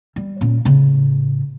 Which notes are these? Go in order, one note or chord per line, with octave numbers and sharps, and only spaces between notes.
G3
A#2 C#4
A2 C#3